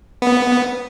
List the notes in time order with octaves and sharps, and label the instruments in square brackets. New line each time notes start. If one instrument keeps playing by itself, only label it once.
[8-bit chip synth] B3